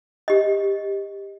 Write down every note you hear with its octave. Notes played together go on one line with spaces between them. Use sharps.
G4 D#5